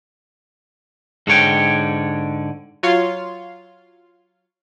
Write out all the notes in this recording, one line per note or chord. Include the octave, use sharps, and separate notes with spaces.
G#2 D3 C#5 G5
F#3 F4 C#5 F5 C6